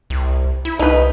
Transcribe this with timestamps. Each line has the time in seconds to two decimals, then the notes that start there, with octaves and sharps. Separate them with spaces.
0.10 C2
0.65 E4
0.79 C2 D#4 B4